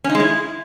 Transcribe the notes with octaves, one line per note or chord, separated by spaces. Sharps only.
C#4
D#4
G#3
E4